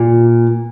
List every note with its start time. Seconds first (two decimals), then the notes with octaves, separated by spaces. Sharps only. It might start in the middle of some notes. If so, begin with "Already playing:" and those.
Already playing: A#2